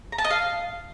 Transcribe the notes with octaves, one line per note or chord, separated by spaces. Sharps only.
A#5
A5
D#5
F5